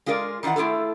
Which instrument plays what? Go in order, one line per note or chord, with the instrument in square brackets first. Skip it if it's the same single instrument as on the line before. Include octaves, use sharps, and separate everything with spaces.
[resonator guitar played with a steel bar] G#3 F4 G#4 A#4 D5
D#3 E3 F4 D5 F#5
A3 E4 F4 G#4 A4